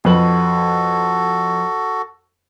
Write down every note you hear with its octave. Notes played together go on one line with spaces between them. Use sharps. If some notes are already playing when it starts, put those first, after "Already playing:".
F2 F#4 A4 B4 F#7